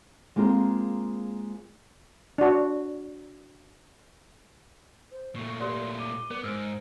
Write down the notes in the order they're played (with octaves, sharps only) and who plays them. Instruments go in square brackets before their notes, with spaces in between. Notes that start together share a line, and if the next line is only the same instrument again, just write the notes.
[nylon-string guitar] G#3 A#3 C4 F4 A#4
[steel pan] D4 F#4
[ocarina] C5
[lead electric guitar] A#2 A3 [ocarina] C#6
[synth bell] G4 A#4 D5 [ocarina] C6
[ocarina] D6 [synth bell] D#7 G7
[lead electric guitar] B3 [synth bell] A#4
[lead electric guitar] G#2 [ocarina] C5 [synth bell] E6 F6 D7